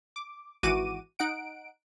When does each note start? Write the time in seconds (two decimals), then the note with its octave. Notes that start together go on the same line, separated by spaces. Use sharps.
0.16 D6
0.63 G#1 E3 F#4 D6 D#7
1.19 D#4 F#5 D7